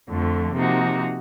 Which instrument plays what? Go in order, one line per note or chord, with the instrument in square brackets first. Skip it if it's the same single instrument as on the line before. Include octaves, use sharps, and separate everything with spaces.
[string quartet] F2 D3 F3 A3
C3 F3 A#3 D#4 F#4